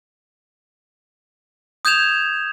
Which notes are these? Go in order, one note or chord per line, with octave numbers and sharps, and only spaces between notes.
D#6 G6 G#6 E7 F7